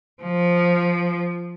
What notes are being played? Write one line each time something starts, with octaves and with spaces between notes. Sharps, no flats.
F3